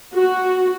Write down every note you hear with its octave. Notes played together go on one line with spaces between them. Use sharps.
F#4